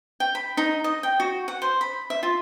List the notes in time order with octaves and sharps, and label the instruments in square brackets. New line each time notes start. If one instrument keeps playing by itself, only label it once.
[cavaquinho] G5
B5
D#4
D#5
G5
F#4
F#5
C5
B5
E5
F4